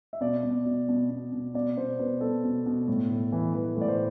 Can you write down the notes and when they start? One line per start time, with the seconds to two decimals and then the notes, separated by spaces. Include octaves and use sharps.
0.13 E5
0.21 B2 D5
0.43 B2
0.65 B2
0.88 B2
1.10 B2
1.32 B2
1.54 B2 D5
1.77 B2 C5
1.99 B2 B4
2.21 B2 A4
2.44 B2
2.66 B2
2.88 A2
3.11 A2
3.32 E3
3.54 E3 B4
3.77 A2 D5
3.88 C5